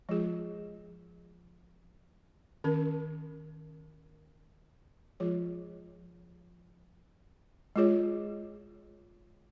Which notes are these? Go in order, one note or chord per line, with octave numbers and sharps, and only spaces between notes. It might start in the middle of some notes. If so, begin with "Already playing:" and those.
F3 G#3 F4 G#4
D#3 C#4 A#4
F3 G#3 F4 G#4 C#5
G#3 F4 G#4 C#5